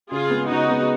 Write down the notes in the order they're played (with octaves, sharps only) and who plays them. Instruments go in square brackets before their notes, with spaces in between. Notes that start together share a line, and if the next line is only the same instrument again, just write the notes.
[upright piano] C#3 [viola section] F4 G#4
[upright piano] G#3 B3
[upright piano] C#3 [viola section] D#4 F#4
[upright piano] G#3 B3